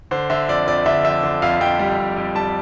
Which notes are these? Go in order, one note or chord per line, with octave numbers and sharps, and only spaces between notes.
D3 C5
D3 E5
F2 D5
F2 D5
D3 E5
F2 E5
D3
F2 F5
F2 G5
G3
F2
F2
G3 A5